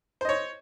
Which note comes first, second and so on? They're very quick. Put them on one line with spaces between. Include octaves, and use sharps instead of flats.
C5 D#5 C#5